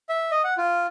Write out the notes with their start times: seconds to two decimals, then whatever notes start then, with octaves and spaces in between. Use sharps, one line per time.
0.09 E5
0.31 D#5
0.44 F#5
0.58 F4